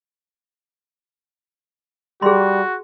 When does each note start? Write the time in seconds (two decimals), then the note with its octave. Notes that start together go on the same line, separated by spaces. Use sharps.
2.22 G3 F#4 G#4 C6